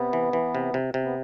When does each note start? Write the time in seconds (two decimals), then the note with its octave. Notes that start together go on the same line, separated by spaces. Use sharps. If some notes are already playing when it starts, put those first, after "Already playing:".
Already playing: C3 B3
0.13 E3
0.33 E3
0.55 C3
0.74 C3
0.94 C3
1.04 B3